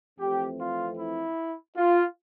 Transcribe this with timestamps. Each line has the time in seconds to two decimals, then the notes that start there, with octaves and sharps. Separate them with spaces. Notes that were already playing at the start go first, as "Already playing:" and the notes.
0.19 F2 E3 A3 C4 G4
0.59 F4
0.99 E4
1.77 F4